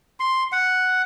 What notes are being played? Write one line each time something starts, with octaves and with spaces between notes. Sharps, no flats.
C6
F#5